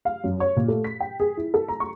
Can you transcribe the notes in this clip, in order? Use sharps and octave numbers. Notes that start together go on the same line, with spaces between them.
F5
F#2
C#5
A#2
A3
B6
G5
G#4
E4
A4
A#5
C#6